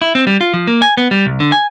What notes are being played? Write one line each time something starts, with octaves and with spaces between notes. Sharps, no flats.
E4
C4
G3
F4
F3
A#3
G#5
B3
G3
C2
D3
G#5